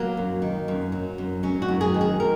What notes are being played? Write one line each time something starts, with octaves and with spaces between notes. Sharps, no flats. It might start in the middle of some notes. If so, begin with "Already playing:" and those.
Already playing: F#3 A#3
F#2
D#3
F#2
F#3
F#2
F#3 C#4
F#4
F#2
G#4
D#3
G#4
A#4